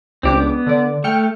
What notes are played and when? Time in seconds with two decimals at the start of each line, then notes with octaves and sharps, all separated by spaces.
0.23 C#2 C4 D4 G4 D6
0.40 B3
0.67 D3 D5
1.04 A3 G5 F6 C#7